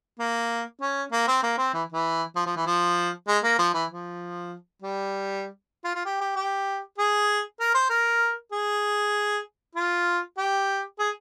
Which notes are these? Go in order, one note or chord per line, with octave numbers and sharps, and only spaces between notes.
A#3
C#4
A#3
C4
A#3
C4
E3
E3
F3
F3
E3
F3
G#3
A#3
F3
E3
F3
G3
F4
F4
G4
G4
G4
G#4
A#4
C5
A#4
G#4
F4
G4
G#4